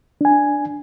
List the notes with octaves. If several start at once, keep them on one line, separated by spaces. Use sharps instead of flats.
D4 G#5